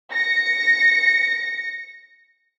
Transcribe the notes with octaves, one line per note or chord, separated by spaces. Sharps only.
A#6 C#7